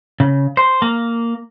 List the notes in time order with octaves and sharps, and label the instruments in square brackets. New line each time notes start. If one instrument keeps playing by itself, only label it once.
[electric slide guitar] C#3
C5
A#3